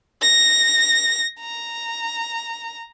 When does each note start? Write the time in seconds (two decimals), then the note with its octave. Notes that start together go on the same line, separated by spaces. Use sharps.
0.21 A#6
1.40 A#5